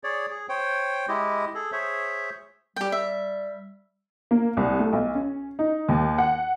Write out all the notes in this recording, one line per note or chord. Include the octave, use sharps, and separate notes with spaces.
G#4 C#5 D5
G#4
C5 C#5 G5
G#3 E4 G4 D#5
G#4 A4
G#4 C5 C#5 E5
G3 G4 G5
E5
A#3
C2
A3
B1
C#4
D#4
D#2
F#5